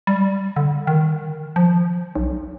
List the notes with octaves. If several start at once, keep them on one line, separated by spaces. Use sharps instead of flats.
G3
D3
D#3
F3
B1